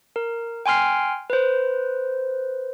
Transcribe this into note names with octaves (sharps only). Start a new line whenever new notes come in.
A#4
G5 G#5 C6 F6 C7
B4 C5